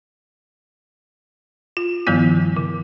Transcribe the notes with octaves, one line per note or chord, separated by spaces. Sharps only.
F4
G2 D#3 F3 G3 B3 E4
C#3